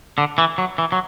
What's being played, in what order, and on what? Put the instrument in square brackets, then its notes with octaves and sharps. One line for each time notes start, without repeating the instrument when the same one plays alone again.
[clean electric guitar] D3
E3
F#3
E3
F#3